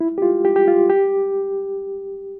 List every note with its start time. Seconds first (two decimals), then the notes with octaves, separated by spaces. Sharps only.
0.01 E4
0.18 G4
0.22 F4
0.45 G4
0.56 G4
0.68 F4
0.90 G4